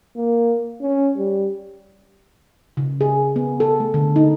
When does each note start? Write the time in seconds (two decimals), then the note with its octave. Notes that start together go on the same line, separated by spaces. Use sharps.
0.16 A#3
0.81 C#4
1.17 G3
2.77 C#3
3.01 G#4
3.36 B3
3.60 A4
3.80 A3
3.94 D3
4.16 D#4